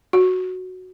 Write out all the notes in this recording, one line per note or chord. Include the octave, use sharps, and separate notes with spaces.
F#4